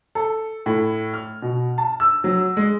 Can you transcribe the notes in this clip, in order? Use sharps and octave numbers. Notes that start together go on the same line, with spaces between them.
A4
A2
F6
B2
A5
E6
F#3
G#3